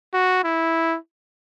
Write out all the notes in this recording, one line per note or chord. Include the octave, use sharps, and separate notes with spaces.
F#4
E4